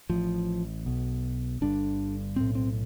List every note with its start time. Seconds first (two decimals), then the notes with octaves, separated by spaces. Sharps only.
0.10 A1 A2 F3
0.86 B1 B2
1.61 G1 G2 D3 D4
2.36 B1 A2 C4
2.55 C4